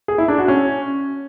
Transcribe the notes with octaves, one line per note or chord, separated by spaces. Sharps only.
G#4
E4
D4
F#4
C#4